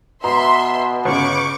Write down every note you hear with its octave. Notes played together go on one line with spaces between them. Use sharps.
B2 E5 A#5 C6
G1 C#3 C#6 D6